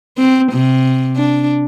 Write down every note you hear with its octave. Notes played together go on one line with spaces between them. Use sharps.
C4
C3
D4